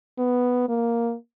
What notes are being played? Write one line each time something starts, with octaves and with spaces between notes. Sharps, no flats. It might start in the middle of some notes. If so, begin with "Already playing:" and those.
B3
A#3